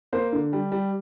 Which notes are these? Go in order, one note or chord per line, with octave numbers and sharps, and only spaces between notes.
A#3 C5
D3
G3
G3